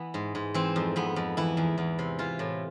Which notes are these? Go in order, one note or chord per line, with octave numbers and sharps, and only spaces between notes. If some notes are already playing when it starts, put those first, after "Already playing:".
Already playing: E3 B3
G#2
G#2
E3 C4
F2
F2 B3
F2
E3 E4
E2
E2
C3
E3 F4
A2